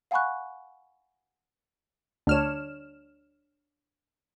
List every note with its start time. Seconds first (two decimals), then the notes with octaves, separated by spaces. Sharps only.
0.11 F5 F#5 G#5 B5 C#6 F#6
2.27 D2 D4 C#5 F6 E7